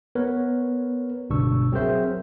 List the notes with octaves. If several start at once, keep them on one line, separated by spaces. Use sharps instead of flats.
B3 A#4 B4 C#5
G1 C#2 B2 D4 C#6 E6
F#3 C4 G#4 A#4 C5 E5